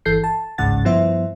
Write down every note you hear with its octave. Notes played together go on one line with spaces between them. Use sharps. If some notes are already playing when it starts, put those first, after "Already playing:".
G1 E3 A4 G6 C7
A5
G1 C#2 G#2 C#3 F#5 A6
G2 F3 B3 E4 C5 E5